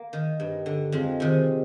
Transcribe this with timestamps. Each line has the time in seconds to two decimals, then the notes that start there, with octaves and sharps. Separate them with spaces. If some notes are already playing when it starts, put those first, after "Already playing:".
Already playing: A#3
0.13 D#3
0.40 G2
0.66 D3
0.92 F2 G#3
1.20 C3 D#3